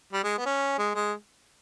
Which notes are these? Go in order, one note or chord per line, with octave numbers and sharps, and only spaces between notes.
G3
G#3
B3
C#4
G#3
G#3